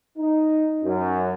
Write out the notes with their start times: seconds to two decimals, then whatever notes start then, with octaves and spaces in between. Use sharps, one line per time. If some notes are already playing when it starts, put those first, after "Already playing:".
0.18 D#4
0.84 F#2